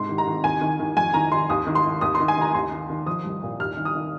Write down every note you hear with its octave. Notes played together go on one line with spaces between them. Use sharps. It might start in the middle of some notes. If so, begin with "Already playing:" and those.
Already playing: G#2 C3 C6
D#3
A#5
D#3
D#2 G#5
D#3
D#3
F2 G#5
D#3 A#5
D#3 C6
D#2 D#6
D#3
C6
D#3
D#2 D#6
D#3 C6
G#5
D#3 A#5
D#2 C6
D#3
D#3
F3 D#6
C2
A#2
D#2 F6
D#3
D#6
D#3